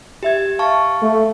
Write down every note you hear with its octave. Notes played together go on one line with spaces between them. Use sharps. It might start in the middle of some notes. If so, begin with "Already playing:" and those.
G4 E5 G#6
F5 A5 C#6
A3